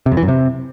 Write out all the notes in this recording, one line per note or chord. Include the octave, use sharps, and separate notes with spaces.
C3
F2
E3
F#2
C3